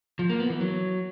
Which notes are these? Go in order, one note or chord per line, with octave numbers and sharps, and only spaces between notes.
F3
A#3
B3
E3
F#3